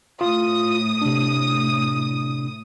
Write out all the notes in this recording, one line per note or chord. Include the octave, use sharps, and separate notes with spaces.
A2 F4 D#6
C3 D4